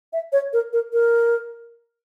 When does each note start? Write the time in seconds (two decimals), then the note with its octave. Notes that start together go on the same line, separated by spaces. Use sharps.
0.13 E5
0.32 C#5
0.53 A#4
0.73 A#4
0.93 A#4